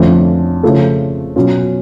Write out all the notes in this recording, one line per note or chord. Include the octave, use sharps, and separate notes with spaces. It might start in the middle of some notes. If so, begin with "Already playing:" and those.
Already playing: F2 D3 F3 A3 C#4
C#3 F3 A3 F4 A4
B2 F#3 C#4 F4